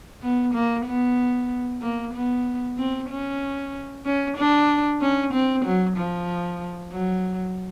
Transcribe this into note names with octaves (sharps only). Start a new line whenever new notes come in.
B3
A#3
B3
A#3
B3
C4
C#4
C#4
D4
C#4
C4
F#3
F3
F#3